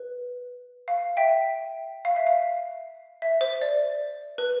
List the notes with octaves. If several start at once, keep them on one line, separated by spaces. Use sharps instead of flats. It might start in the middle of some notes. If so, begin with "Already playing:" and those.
Already playing: B4
F5
E5 G5
F5
E5
F5
E5
C5
D5
B4